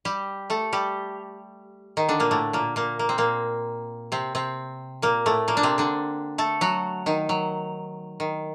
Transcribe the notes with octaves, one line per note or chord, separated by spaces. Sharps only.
G3 G4
A3 A4
G3 G4
D#3 D#4
D3 D4
A#2 A#3
A2 A3
A#2 A#3
A#2 A#3
A#3
C4
A#2 A#3
C3 C4
C3 C4
A#2 A#3
A2 A3
A#2 A#3
D4
C3 C4
D3 D4
A3 A4
F#3 F#4
D#3 D#4
F#3
D#3